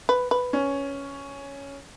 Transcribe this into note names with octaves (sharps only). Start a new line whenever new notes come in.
B4
B4
C#4